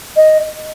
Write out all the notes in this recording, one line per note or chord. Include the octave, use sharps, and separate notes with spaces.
D#5